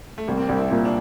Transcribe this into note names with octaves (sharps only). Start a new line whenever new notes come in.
A3
C2 A#3
C4
C2 D4
E4
A#2
D4